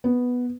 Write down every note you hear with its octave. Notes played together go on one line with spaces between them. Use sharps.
B3